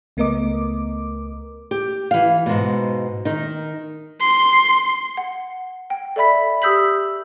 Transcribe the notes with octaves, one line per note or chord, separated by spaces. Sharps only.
C#2 A3 B3 A#4 D#5 D6
G4
E3 F5
G#2 B2
D#3 D#4
C6
F#5
G5
A4 D5 E5 B5 B6
G4 D#6 E6 G6 B6 F#7